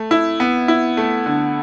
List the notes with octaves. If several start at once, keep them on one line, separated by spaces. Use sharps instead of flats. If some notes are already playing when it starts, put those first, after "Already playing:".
Already playing: A3
E4
B3
E4
A3
D3